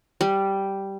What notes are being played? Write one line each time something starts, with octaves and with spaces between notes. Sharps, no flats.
G3